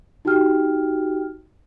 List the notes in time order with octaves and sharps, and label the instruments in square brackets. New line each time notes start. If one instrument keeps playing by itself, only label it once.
[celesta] D#4 F#4 G4 G5 F6